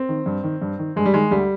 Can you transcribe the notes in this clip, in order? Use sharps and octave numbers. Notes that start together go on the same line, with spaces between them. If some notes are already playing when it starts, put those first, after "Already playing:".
Already playing: C4
D#3
G2
D#3
G2
D#3
G2 G#3
G3
D#3 G#3
D2 G3